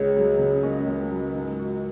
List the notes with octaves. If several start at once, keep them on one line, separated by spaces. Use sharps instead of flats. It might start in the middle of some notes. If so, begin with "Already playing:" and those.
Already playing: C#2 G#4 C#5
F#3
C#3
C#4 A#4 D#5
C#2
F#3
G#2
F#4